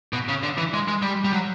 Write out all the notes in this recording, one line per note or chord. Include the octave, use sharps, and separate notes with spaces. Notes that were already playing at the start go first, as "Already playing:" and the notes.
B2
C#3
D3
E3
G#3
G#3
G3
G3
F#3